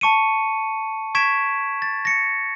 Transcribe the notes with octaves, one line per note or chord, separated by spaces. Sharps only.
A5 C#6 C#7 D#7
C#6 G#6 B6 D7 E7
A6
A#6 C#7